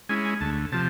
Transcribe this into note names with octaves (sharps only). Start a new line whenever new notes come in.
G#3 C#4 E4 G#5
G#5
D2 A5
C3 F3 A5